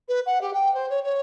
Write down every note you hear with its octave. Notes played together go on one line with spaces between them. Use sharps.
B4
F#5
G4
G5
C5
C#5
C#5